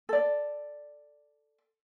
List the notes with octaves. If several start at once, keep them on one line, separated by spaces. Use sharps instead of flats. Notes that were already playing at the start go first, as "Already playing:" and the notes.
A4 D5